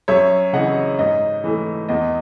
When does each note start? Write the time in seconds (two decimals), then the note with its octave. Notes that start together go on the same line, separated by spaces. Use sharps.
0.08 F#2 C#5 E5
0.53 C#3 E3 D#5 F#5
0.99 G#2 D#5
1.44 E3 A3
1.89 E2 D#5